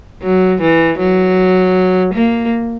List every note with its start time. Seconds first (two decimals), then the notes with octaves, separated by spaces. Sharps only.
0.22 F#3
0.61 E3
0.99 F#3
2.14 A#3